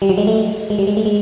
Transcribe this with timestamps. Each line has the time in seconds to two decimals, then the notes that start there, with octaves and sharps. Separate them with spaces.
0.02 G3
0.09 F#3
0.18 G#3
0.27 A3
0.70 G#3
0.79 G3
0.87 G#3
0.97 A3
1.05 G#3